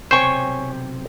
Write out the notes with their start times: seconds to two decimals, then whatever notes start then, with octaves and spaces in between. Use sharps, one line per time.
0.11 B1 C3 C5 C#5 G5 G#5 C#6